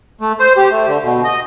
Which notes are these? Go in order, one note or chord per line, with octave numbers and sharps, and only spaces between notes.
A3
C5
G4
A3
D3
B2
D#5